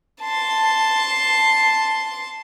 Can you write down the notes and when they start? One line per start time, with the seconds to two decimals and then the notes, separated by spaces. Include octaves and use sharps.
0.22 A5 C6